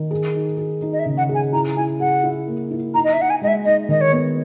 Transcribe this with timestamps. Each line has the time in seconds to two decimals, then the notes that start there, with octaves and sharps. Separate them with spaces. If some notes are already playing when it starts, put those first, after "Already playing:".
Already playing: D#3
0.11 G#4
0.35 D#4
0.58 G#4
0.82 D#4
0.93 D#5
0.99 E5
1.06 C#3
1.18 F#5
1.29 G#4
1.35 G#5
1.53 E4 A#5
1.76 E4 G#5
2.00 G#4 F#5
2.24 E4
2.47 A#3
2.71 E4
2.94 D#4 A#5
3.04 D#5
3.13 E5
3.18 D#4 F#5
3.30 G#5
3.42 G#3 D#5
3.48 E5
3.65 D#4 D#5
3.89 D#3 D#5
4.01 C#5
4.12 B3